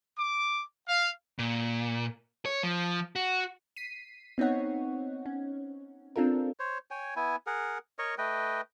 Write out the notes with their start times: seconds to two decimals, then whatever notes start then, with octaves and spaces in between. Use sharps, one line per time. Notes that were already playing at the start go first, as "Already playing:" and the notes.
0.18 D6
0.88 F5
1.39 A#2
2.46 C#5
2.63 F3
3.16 F#4
3.76 B6 C7 D#7
4.38 B3 C4 D#4 C#5 F#5
5.26 C#4
6.16 C4 D4 F4 A4 A#4
6.59 C5 C#5
6.91 C#5 G5 G#5
7.16 B3 E4 G#5
7.47 G#4 A#4 F#5
7.99 A#4 C#5 D#5 C#6
8.18 A3 B4 D#5 G5